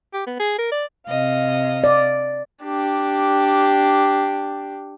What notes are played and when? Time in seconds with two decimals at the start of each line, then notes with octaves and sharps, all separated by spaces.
0.14 G4
0.27 B3
0.40 G#4
0.59 A#4
0.72 D5
1.06 C3 D#5 F5
1.84 D5
2.64 D4 G4